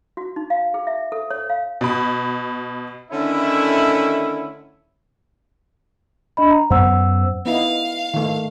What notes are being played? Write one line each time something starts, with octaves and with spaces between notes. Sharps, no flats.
F#4
D#4
F5
G#4
E5
A4
C#5
F5
B2 B5
D3 D#3 A3 C#4 E4
D4 D#5 B5
A#5
F#2 B3 C5 F#5 E6
B3 D#4 E4 F5
D#3 A3